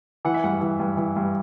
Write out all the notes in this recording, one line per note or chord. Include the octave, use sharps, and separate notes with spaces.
E3 F#5
E5
G2 F#5
E3
G2
E3
G2